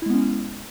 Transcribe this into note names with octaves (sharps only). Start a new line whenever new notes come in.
G#3 B3 C#4 E4